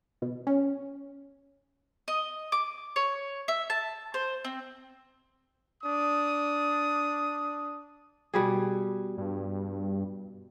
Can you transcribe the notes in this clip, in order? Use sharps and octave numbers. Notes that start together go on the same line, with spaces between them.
B2
C#4
D#5
D6
C#5
E5
A5
C5
C4
D4 D#6
B2 G3 G#4
G2